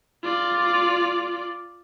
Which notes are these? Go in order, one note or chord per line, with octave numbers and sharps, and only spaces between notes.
F4 D5